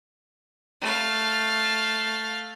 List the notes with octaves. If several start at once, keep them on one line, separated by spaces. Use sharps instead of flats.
A3 F5